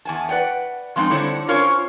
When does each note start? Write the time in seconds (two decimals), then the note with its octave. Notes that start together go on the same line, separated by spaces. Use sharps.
0.05 E2 G#5 A5
0.29 B4 D5 F#5 G5
0.96 F3 G#3 C4 C#4 D#4
1.10 D3 G3 C4 E4 C5 C#5
1.48 C#4 F4 A#4 C5 C#5